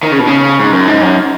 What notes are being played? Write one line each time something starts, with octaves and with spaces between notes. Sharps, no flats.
D#3
C#3
B2
C#3
G#2
F#2
G#2
F#2